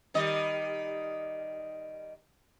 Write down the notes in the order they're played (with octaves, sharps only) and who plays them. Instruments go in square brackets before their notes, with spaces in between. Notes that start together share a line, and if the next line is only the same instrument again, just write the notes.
[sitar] D#3 G3 D#5